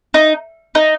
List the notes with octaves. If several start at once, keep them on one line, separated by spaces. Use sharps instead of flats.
D#4
D#4